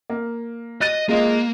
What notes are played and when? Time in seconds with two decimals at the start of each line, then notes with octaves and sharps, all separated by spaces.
0.10 A#3
0.81 D#5 F#6 A6 D#7
1.09 G#3 A#3 F4 D#5